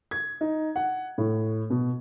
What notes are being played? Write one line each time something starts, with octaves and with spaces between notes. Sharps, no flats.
G#6
D#4
F#5
A2
B2